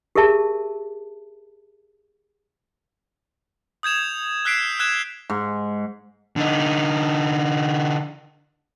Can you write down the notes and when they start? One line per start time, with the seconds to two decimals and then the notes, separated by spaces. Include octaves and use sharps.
0.15 G4 G#4 A#4 E5 A5
3.83 D#6 G6 G#6 E7 F7
4.45 E6 F#6 B6 C7 D7 E7
4.79 E6 F#6 G#6 E7
5.30 G#2
6.36 D3 D#4